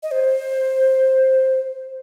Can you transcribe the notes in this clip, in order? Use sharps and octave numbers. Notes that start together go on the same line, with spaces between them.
D#5
C5